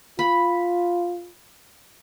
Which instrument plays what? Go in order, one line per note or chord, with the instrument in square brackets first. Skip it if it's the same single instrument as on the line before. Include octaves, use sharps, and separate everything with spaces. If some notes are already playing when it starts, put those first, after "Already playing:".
[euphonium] F4 [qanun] B5